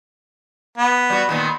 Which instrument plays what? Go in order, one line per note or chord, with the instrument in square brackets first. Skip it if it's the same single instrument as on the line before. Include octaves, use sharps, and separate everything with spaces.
[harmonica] B3
[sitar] G3 F#4
A#2 D#3 B3